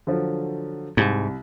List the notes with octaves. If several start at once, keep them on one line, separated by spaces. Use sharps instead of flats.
D3 F3 F#3
C2 G#2